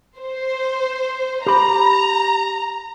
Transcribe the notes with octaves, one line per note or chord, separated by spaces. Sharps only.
C5
G4 A#5 B5